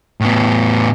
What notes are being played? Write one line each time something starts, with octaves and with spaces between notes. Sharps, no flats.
A2 B3